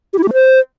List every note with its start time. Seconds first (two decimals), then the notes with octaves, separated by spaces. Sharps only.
0.13 G4
0.18 E4
0.23 G4
0.28 A3
0.33 C5